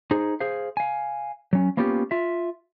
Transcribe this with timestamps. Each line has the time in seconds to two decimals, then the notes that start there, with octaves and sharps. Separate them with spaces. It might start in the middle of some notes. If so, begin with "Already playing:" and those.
0.11 D#4 G#4 C5
0.40 G#4 C5 F5
0.77 F5 G#5
1.53 F#3 C#4
1.77 A#3 B3 C#4 F4 G4
2.11 F4 E5